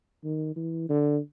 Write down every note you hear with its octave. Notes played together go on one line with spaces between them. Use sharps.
D#3
E3
D3